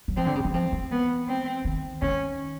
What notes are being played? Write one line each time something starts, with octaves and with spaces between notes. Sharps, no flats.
F#3
F3 C4
D3
C#3
F#3
F3 C4
E3
B3
C4
D#3
D#3 C#4